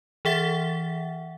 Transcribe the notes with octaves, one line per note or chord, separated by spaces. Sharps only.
E3 G#4 E5 F#5 A6